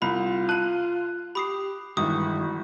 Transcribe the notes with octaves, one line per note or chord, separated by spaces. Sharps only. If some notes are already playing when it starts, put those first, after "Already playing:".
C2 F4 B5
A5 F#6 D#7 F#7
G4 B5 D#6 C7
G1 G2 D#3 E3 G#3 F#4 D#6